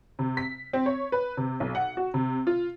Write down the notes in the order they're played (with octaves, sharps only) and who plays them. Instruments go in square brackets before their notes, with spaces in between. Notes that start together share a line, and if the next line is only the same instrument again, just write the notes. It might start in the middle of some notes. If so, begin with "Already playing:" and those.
[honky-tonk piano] C3
B6
C4
C#5
B4
C3
B1
F#5
F#4
C3
F4